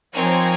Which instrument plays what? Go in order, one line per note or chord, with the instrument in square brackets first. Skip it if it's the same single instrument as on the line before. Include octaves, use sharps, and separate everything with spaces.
[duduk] F3 [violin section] C4 D#4 A#4 C#5 G#5